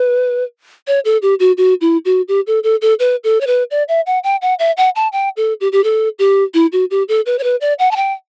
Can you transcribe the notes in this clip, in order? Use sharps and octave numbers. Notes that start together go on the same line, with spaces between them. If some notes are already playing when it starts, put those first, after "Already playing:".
Already playing: B4
C#5
A4
G4
F#4
F#4
E4
F#4
G4
A4
A4
A4
B4
A4
C#5
B4
D5
E5
F#5
G5
F#5
E5
F#5
A5
G5
A4
G4
G4
A4
G4
E4
F#4
G4
A4
B4
C#5
B4
D5
F#5
A5
G5